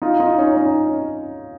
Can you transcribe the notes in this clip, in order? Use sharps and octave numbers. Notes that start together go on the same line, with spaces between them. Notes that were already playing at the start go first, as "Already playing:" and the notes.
D#4 F4
D#4 F4
C#4 D#4
C#4 D#4